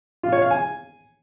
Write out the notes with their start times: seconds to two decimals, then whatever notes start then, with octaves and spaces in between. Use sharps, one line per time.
0.23 F4
0.32 C#5
0.42 F5
0.51 G#5